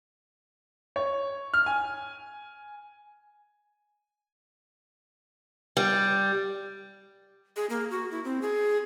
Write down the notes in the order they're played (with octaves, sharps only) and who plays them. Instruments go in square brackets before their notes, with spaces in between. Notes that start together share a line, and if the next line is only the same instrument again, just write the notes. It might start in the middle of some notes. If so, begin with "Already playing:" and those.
[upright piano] C#5
F6
G#5
[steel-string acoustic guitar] G3
[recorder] G#4
A#3
F#4
E4
C4
G#4